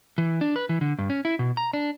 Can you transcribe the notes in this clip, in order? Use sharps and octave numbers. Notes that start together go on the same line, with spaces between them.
E3
D4
B4
E3
D3
G2
C#4
E4
B2
A#5
D4